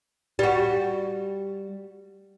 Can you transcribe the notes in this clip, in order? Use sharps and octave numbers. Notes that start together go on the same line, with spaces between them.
G3 F#4